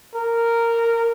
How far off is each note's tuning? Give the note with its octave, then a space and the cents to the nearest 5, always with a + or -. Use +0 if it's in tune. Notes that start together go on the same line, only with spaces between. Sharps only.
A#4 -10